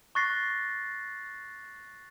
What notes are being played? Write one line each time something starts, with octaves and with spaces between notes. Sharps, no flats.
C#6 D6 F#6 A6 A#6 C7